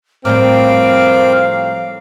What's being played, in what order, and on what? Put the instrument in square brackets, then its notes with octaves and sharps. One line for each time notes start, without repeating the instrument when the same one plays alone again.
[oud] A2 F3 G3 [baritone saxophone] C4 [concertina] A#4 D6 [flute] F5